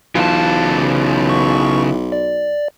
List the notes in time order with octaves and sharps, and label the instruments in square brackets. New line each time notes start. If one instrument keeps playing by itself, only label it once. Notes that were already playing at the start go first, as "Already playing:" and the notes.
[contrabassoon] B1 [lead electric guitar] C#3 A5 [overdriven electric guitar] E3 F4
[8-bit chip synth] C#6
D5